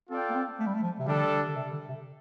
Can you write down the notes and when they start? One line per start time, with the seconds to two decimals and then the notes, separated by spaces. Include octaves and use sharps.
0.10 C4 F4 A4 D5 G5
0.29 A#3
0.35 C4
0.59 A3
0.67 G3
0.74 A3
0.82 F3
1.00 C3
1.07 D3 G3 D4 A4
1.47 D3
1.55 C3
1.73 D3
1.88 C3